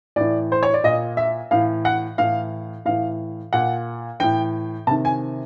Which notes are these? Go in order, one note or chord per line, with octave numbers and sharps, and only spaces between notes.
A2 E3 D5
C5
C#5
D5
A#2 D#5
E5
A2 E3 F5
F#5
A2 E3 F5
A2 E3 F5
A#2 F#5
A2 E3 G5
C3 D#3 A5
G#5